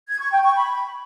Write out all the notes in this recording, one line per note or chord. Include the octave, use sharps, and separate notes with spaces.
G#6
C#6
G5
C#6
B5